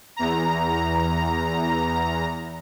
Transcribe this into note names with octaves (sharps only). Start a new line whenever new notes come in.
E2 A#5